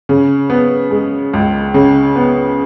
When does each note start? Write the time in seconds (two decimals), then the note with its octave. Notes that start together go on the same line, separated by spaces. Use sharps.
0.09 C#3
0.50 B3
0.91 G#3
1.33 C#2
1.74 C#3
2.16 B3